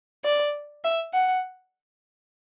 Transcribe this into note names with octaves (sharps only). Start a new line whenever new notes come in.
D5
E5
F#5